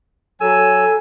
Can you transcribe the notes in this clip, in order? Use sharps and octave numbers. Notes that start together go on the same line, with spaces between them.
F#3 A4 G#5 E6